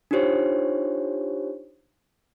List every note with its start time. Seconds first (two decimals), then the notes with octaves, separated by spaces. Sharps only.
0.11 D4 D#4 F4 G4 C5 C#5